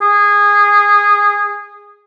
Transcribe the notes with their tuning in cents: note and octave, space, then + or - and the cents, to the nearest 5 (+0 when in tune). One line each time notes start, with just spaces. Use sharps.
G#4 -15